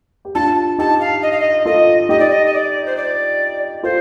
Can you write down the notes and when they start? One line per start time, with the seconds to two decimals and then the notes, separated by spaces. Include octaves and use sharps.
0.25 G4
0.34 D4 F4 A5
0.78 D#4 G4 A5
1.00 F5
1.22 D#5
1.31 F5
1.39 D#5
1.65 F4 A4 D#5
2.09 D#4 G4 D#5
2.19 D5
2.30 D#5
2.46 D#5
2.53 D5
2.85 C5
2.96 D5
3.83 F4 A4 C5